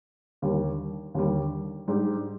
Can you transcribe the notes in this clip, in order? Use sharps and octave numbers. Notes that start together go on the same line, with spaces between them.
D#2 D3 G3
D#2 D3 G3
G#2 G3 D4 G4